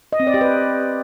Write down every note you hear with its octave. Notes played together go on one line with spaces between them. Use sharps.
D#5
C4
D5
G4
B4